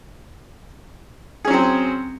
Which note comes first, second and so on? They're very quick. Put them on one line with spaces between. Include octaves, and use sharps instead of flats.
G#4 C#4 F#3 C4